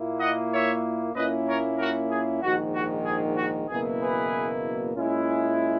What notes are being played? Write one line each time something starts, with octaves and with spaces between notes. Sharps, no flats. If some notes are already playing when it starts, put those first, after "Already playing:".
Already playing: A#2 A#3 E4
D#5 F#5
C#5 E5
A#2 A#3 C#4 E4 B4 D#5
A#4 C#5
F#4 A#4
G#4
A#1 G#2 D#3 F#4
F#4
G#4
F#4
F#1 E2 B2 A#3 E4 G#4
G#4 B4
A#2 G#3 C#4 E4